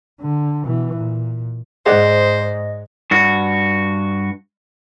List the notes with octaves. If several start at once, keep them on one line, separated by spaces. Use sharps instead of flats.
D3
B2 E3
A#2
G#2 G#3 C5 D5 D#5 F#5
G2 F#4